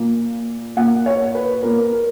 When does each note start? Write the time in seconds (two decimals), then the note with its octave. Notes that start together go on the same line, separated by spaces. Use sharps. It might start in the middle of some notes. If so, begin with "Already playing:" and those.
Already playing: A#2 A#3
0.76 A#2 A#3 F#5
1.06 C#5
1.35 B4
1.63 A#2 A#3 A#4
1.93 A#4